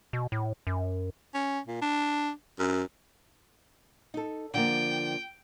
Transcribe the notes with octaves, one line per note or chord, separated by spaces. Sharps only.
B2
A2
F#2
C#4
A#2
D4
F#2
D#4 A4
D3 F3 A#3 G5